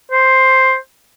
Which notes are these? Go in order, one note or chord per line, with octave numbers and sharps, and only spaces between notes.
C5